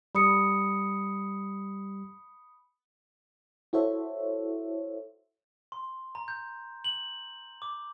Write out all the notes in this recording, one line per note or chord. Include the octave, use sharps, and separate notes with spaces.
G3 B5 D#6 C#7
E4 F#4 A4 C5 C#5 E5
C6
A#5
G6
F#7
D6